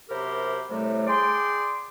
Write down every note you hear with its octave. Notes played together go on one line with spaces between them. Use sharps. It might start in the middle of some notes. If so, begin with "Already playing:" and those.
F#2 C3 G4 A#4 C5 B5
A2 C3 G3 A3
G#4 D5 G5 C6